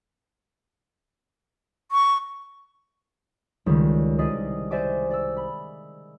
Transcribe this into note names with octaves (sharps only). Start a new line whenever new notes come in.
C#6
C#2 D#3 G3
C2 G#4 D5 D#5 B6
C5 D5 E5 G#5 D6
D5 E6
B5